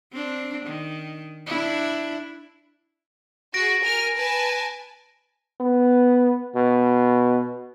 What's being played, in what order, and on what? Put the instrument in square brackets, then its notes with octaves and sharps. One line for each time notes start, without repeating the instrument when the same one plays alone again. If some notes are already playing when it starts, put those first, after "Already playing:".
[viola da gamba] C4 D4
D#3
D4 E4
[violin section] F#4 G#4 [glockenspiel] A#6 D7
[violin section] A#4 G#5 F6
B4 G#5 A5
[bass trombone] B3
B2